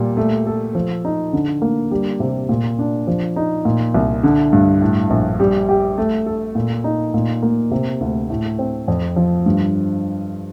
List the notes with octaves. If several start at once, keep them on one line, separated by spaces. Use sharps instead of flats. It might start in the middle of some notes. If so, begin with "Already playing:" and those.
Already playing: A#2 G3
A3
A4
F3
D#4
D3
A#3
G3
C3
A#2
D4
F3
D#4
A#2
C2
D3
G2
A2
A#1
G3
G4
A3
A4
A#2
D#4
A#2
A#3
C3
D2
A2
C4
F2
F3
G2